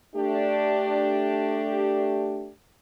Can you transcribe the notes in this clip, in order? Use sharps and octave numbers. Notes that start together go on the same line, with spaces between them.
A3 D4 G4